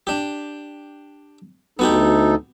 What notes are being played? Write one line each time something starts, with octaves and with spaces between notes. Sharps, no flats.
D4 G4
D2 B3 D#4 F#4 G4 A4